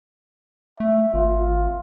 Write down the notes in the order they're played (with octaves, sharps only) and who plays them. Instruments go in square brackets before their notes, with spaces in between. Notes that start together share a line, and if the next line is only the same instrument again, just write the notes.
[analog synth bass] A3 [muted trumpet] E5
[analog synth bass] G#1 [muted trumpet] F4